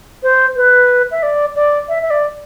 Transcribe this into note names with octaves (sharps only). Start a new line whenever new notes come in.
C5
B4
E5
D5
D5
E5
E5
D5